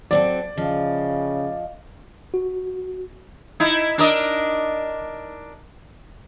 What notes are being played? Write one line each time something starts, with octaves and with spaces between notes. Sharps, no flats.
F#3 C4 A4 D5
C#3 F3 D#5 F5
F#4
D#4 E4
D4 A#4 D#5